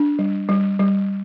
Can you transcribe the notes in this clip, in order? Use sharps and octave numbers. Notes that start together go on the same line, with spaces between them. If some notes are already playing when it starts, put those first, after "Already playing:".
Already playing: D4
G3
G3
G3